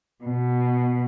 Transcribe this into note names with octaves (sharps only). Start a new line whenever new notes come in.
B2